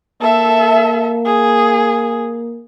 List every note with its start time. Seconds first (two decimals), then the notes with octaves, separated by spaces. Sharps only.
0.21 A#3 A4 E5
1.26 G#4